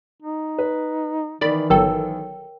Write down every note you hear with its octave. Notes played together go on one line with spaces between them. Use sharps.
D#4
B4
D#3 E3 D5 B5
G1 F#3 A4 A#4 C#5 G5